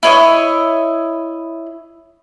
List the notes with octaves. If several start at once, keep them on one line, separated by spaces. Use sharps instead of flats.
E4 C#5 D#5 D#6